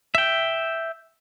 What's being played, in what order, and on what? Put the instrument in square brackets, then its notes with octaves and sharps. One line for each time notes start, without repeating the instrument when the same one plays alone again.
[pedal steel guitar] E5 G5